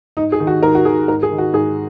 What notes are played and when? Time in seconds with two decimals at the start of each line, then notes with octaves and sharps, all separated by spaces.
0.17 G#2 D#4
0.32 G#4
0.40 D#3
0.47 F#4
0.63 G#2 A#4
0.75 F#4
0.85 D#3 G#4
1.08 G#2 A#4
1.23 G#4
1.31 D#3
1.38 F#4
1.53 G#2 G#4